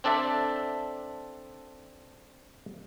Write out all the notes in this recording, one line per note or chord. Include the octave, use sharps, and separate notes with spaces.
C4 D4 A4 D5 E5